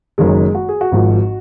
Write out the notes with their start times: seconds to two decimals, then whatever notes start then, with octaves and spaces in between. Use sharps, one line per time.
0.18 F#1 F#2 D#3 G#3
0.55 F#4
0.69 G#4
0.81 F#4
0.92 G#1 G#2 F3